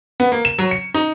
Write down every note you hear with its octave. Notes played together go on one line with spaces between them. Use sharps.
B3
A#3
E7
F#3
C#7
D#4